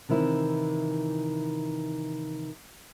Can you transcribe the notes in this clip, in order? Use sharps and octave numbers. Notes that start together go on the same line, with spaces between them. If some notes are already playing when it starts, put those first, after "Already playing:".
C3 D#3 E3 E4